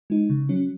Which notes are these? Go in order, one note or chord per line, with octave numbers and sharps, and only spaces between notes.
G#3 D#4
C#3
F#3 C#4